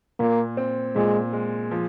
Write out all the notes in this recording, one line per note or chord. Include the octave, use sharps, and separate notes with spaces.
A#2 A#3
C4
A#2 G#3
G#3
F3